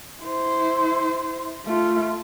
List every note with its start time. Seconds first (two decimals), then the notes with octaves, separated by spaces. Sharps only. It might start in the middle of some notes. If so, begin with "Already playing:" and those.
0.22 E4 C5
1.66 A3 F4